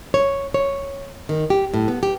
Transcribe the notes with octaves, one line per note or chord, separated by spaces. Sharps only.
C#5
C#5
D#3
G4
A2
B3
G4